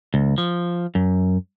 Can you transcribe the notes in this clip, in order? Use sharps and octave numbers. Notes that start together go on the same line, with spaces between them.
C#2
F3
F#2